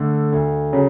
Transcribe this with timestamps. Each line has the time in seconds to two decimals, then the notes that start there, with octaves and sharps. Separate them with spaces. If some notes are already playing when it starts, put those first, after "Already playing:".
Already playing: D3 A3
0.32 D2
0.73 C#3 F#3